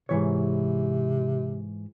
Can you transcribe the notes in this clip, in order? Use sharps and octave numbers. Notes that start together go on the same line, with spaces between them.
G#2 C3 E3 C#5